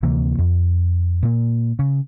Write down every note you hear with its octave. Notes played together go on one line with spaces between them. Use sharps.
D2 C3 E3 A#3
F2
A#2 A#3
C#3